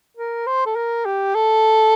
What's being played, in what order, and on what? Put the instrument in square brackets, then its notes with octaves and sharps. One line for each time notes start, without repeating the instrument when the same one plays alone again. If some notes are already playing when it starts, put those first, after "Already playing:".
[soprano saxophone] A#4
C5
A4
A#4
G4
A4